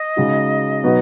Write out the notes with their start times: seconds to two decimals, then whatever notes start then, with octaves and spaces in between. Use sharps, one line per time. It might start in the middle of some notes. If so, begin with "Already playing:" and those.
Already playing: D#5
0.16 C#3 G#3 D#4 F#4
0.83 B2 F#3 B3 D#4 F#4